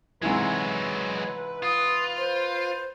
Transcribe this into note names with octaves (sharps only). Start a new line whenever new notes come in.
G#2 C3 E3 F#3 G#3 B4
F4 D#6
C5